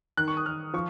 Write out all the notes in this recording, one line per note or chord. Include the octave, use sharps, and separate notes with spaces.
D#3 F#6
C#6
D#6
D#3 F6
F3 C#6